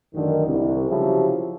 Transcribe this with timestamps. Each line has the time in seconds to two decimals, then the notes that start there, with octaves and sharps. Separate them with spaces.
0.15 A1 F#2 D3 D#3
0.46 C2
0.90 C#3 F3 F#3 E4 G4